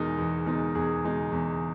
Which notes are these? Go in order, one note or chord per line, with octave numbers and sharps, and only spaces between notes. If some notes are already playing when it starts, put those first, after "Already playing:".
Already playing: E2 B2 G#3 D#4 A#4
E2
B2 G#3 D#4
E2 G#4
B2 G#3 D#4
E2